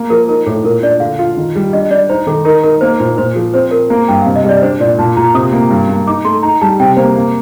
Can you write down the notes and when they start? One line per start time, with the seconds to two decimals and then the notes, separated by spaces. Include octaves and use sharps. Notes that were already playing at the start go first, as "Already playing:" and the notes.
Already playing: A#3
0.10 F3 A#4
0.28 D#4 A#4
0.46 A2 A4
0.64 A#2 A#4
0.83 D4 D5
1.00 D3 F5
1.19 F4
1.37 D#3
1.56 G3
1.73 D4 D#5
1.91 D4 D5
2.09 D#4 C5
2.27 D#3 A4
2.45 D#4 A#4
2.64 D#4 A#4
2.81 A#3 C5
2.99 A#2 C5
3.18 A#2 C5
3.36 F3
3.54 C4 C5
3.71 C4 A#4
3.90 A#3
4.08 G2 G5
4.22 C3 F5
4.36 D#5
4.44 G3 D5
4.62 D4 C5
4.80 A#2 D5
4.98 A#2 A5
5.17 A#2 A#5
5.34 C3 D#6
5.53 A#3
5.70 G2
5.89 A#3
6.07 D#4 D6
6.25 A3 C6
6.43 D#4 A#5
6.61 G3 A5
6.80 C3 G5
6.97 A#3 C5
7.16 A#3